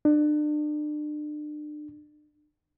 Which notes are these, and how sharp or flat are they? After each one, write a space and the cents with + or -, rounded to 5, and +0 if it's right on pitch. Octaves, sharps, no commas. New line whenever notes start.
D4 +35